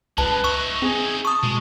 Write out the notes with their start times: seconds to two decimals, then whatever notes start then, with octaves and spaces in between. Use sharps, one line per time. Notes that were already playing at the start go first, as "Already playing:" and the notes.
0.18 C#2 F#2 G#3 B4 A5
0.44 D#4 E5 C#6
0.82 C4 G#4
1.25 A5 C#6 D#6
1.43 B2 G#3